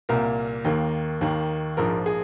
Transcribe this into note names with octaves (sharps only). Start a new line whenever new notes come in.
C2 A#2 A#3 A#4
D#2 D#3 A#3
D#2 D#3 A#3
A#1 G#2 F3 A#3 A#4
G#4